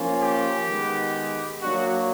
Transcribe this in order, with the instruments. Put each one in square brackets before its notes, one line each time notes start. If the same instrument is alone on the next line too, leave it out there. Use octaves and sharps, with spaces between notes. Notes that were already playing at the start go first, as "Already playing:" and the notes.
Already playing: [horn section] F3 A#3 C#4 F4
G4
D#3 G#3 B3
F#3 A#3 D4 F#4